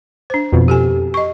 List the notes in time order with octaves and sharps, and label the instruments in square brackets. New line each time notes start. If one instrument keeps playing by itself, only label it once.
[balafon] D4 C5
[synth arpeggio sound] F2 B2
[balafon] G4 A4 G#5
D#5 C#6